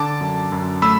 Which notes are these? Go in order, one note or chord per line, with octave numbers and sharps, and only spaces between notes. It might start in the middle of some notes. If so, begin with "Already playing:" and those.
Already playing: D3 A5 D6
F#2
F#2
A3 B5 E6